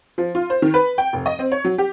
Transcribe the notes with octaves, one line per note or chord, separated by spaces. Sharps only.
F3
F4
C5
D#3
B4
G5
F1
D#5
C4
C#5
F#3
G4